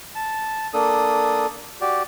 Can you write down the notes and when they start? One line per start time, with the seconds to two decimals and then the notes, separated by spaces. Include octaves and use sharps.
0.15 A5
0.74 A#3 D4 A4 D#6
1.81 F#4 G4 D5